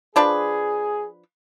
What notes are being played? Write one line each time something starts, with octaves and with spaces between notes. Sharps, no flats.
F3 D4 G#4 B4